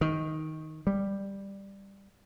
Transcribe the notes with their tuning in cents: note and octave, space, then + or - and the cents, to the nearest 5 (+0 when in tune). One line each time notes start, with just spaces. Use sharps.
D#3 +10
G3 +10